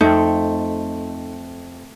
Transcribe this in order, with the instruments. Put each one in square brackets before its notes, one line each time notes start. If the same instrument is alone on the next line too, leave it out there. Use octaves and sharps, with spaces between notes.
[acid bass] F2 [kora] A3 C4 [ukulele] D#4